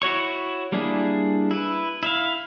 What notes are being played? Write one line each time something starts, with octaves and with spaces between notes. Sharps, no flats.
E4 F#4 C#5 C#6
G3 A#3 D4 E4 G#4
E4 B4
E4 E5 F5